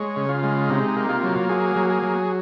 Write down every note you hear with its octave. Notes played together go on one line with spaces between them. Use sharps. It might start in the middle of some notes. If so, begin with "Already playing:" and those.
Already playing: G#3 C#5
C#3
F4
G#3
C3 D#4
A#3
F4
F#3
A#3 G#4
F#3
G#4
F#3